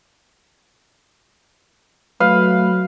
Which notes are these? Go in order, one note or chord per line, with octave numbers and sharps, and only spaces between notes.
F#3 A3 B4 F5